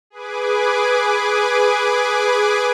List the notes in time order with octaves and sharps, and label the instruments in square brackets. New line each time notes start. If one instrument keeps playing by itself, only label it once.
[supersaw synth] G#4 B4 G#5 D6